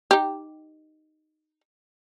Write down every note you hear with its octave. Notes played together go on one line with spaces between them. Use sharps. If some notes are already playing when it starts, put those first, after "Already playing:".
D#4 G4